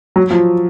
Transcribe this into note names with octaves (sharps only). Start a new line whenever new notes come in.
F#3
F3